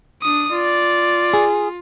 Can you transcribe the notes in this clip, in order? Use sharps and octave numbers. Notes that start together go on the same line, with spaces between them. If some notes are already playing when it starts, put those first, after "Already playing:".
D4 D#6
F4 D5
G#4